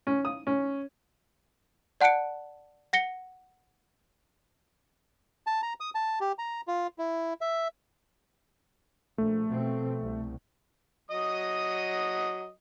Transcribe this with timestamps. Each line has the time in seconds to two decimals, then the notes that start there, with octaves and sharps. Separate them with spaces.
0.07 C#4
0.25 D#6
0.47 C#4
2.01 D5 F#5 A5 F#6 C#7 D7
2.93 F#5 A#6 C#7 G7
5.47 A5
5.62 A#5
5.80 D#6
5.95 A5
6.21 G4
6.38 A#5
6.68 F4
6.98 E4
7.41 E5
9.18 A#1 A3
9.49 B2 F3 C4
10.00 C2
11.11 F#3 D#5 D#6